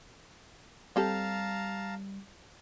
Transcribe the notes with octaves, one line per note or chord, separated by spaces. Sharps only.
G3 C4 G4 A4 F5 A5 A#5